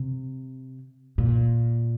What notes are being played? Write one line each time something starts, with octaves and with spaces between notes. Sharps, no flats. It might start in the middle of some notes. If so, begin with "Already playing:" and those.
Already playing: C3
A#2